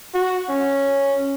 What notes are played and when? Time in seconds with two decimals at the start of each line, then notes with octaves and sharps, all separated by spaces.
0.14 F#4
0.49 C#4